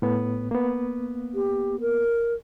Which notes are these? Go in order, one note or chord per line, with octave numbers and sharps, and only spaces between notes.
A2 B3
A#3 B3
G4
A#4